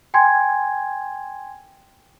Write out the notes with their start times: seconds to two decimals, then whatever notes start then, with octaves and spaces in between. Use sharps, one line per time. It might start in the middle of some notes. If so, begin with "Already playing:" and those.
0.14 G5 G#5 C6 G#6